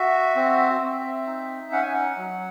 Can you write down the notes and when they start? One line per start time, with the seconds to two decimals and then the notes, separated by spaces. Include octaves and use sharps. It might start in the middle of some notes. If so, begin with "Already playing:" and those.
Already playing: F#4 E5
0.36 C4
0.81 C4
1.27 D#4
1.72 C#4 F#5
1.82 G#5
1.94 F#5
2.17 F#3